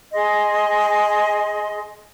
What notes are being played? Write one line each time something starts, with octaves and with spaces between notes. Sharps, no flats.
G#4 D#5 C6